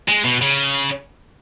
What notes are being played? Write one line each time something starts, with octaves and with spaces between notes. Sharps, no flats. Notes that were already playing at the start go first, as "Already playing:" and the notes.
G#3
B2
C#3